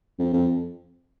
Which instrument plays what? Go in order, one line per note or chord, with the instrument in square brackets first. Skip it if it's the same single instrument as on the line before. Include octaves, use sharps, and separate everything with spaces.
[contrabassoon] F2
F2